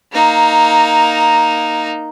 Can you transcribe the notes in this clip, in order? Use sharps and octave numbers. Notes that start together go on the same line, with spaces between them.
A#3 D#4